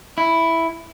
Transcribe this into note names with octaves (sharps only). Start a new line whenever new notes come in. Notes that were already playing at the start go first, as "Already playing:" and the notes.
E4